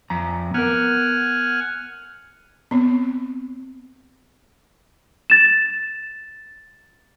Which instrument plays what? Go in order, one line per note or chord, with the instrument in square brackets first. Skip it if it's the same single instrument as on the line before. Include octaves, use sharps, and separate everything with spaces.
[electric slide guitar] F2 A#5
[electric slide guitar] B3 A#4 [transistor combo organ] F#5 G#5 F6
[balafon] B3 C4
[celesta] A6 E7